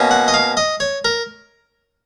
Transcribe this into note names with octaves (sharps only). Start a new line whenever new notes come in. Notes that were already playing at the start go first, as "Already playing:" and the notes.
Already playing: B2 A#3 C#4
F#5
D#5
F5
D#5
C#5
A#4